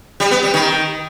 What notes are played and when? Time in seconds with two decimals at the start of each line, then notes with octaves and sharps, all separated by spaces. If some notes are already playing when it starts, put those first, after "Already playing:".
0.20 G3
0.31 B3
0.42 G3
0.54 D#3